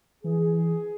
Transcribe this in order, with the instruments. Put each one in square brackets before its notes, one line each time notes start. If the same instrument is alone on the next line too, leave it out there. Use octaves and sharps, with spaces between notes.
[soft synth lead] E3 [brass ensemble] G#4